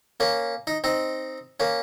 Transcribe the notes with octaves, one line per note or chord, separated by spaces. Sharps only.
A#3 C#4
D#4
C4 D#4
A#3 C#4